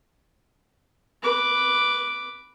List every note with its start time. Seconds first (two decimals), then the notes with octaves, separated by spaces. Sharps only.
1.22 B4 D6